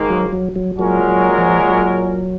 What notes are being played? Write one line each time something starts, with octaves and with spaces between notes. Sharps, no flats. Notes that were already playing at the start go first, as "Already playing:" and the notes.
Already playing: G#2 D#3 A#3
F#3
F#3
F#3
A#2 F#3 G#3 C#4 F#4 A#4
F#3
F3
F#3